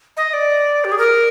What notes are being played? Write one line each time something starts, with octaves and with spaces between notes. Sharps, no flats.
D#5
D5
G4
G#4
A#4